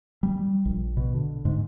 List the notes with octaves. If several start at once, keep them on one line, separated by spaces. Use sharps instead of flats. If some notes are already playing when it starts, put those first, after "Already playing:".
G3
A#1
B2
D3
G#2